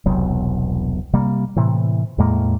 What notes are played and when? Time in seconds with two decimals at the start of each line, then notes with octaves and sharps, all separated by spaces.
0.06 E1 C2 B2 F#3
1.13 C3 G3 A#3
1.56 A2 C3 E3
2.18 E2 A2 G#3 A#3